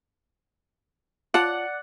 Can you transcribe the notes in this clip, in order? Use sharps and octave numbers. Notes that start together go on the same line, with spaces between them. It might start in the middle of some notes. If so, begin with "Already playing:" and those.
F4 C#5 D5 F#5 A5